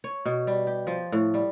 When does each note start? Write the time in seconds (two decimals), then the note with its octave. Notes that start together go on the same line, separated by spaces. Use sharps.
0.04 C#5
0.25 B2
0.47 G3
0.67 G4
0.87 F3
1.12 A2
1.34 G3